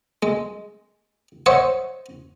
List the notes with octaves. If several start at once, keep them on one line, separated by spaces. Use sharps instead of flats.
G#3
C5 C#5 D#5 E5 F#5